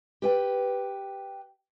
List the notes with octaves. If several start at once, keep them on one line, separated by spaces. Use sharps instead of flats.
G4 B4 G5